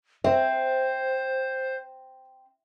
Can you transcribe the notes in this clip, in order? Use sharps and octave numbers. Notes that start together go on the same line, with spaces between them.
C4 C5 E5